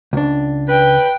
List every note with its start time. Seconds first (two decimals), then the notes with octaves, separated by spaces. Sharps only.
0.13 C#2 D4
0.68 B4 G5